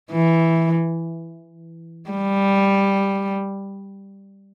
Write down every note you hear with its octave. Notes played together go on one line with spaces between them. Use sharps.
E3
G3